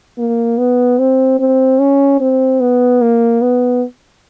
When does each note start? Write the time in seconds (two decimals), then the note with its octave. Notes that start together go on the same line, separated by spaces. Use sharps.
0.18 A#3
0.58 B3
0.99 C4
1.39 C4
1.80 C#4
2.20 C4
2.61 B3
3.02 A#3
3.42 B3